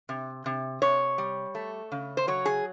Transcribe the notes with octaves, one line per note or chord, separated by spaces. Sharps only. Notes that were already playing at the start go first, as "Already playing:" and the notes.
C3
C3
C3 C#5
G3
A3
C#3
C5
F#3 C#5
G#4